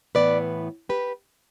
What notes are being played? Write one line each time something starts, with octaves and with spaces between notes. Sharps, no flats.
A2 E3 B3 E4 B4 D5
G4 B4